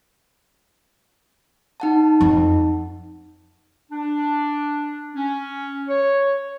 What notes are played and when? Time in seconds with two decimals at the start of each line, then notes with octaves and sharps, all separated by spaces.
1.80 D#4 F#5 A5
2.21 F2
3.91 D4
5.15 C#4
5.88 C#5